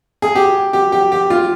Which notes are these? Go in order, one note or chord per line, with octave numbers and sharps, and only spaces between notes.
G#4
G4
G4
G4
G4
F4